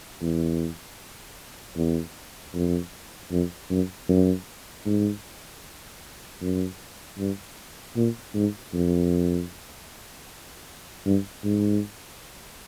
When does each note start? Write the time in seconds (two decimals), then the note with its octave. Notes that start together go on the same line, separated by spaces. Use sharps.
0.21 E2
1.76 E2
2.54 F2
3.31 F2
3.70 F#2
4.09 F#2
4.86 G#2
6.42 F#2
7.18 G2
7.96 A#2
8.35 G#2
8.73 F2
11.06 G2
11.44 G#2